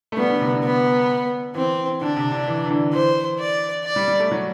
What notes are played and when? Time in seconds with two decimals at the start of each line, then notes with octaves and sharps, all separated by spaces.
0.12 A3
0.17 G3 B3
0.29 D3
0.41 C3
0.52 D3
0.63 B3
1.55 E3 C4
2.01 D3 D4
2.17 C3
2.32 D3
2.47 E3
2.66 E3
2.70 D3
2.93 E3 C5
3.39 D5
3.85 D5
3.96 G3
4.08 G3
4.20 A3
4.31 F#3